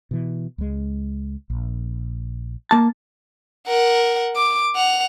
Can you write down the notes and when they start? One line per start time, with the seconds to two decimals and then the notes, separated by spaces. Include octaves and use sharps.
0.11 B2 E3
0.58 C#2 G#3
1.50 A#1
2.71 A#3 A5
3.67 A#4 F#5
4.36 D6
4.75 F#5 F7